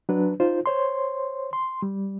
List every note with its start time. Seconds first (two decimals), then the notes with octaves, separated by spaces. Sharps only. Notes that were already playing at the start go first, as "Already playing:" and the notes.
0.09 F#3 D4 B4
0.40 D#4 F4 C5
0.66 C5 C#5 C6
1.53 C6
1.82 G3